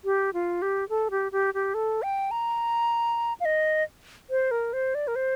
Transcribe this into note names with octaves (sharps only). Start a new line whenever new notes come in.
G4
F4
G4
A4
G4
G4
G4
A4
G5
A#5
F5
D#5
C5
A#4
C5
D5
A#4
C5